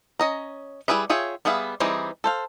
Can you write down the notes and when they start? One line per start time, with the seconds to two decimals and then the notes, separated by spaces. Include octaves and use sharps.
0.19 C#4 D#5 A#5
0.88 G3 E4 G#4 B4 E5
1.10 F4 G#4 C#5 E5 G5
1.45 G3 B3 G#4 E5 F5
1.80 E3 G3 C4 D#4 G#4
2.24 A4 C5 F5